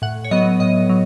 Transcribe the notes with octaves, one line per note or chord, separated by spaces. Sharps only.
A2 F#5
C#5
F#3 B3 D#5
A2 D#5
F#3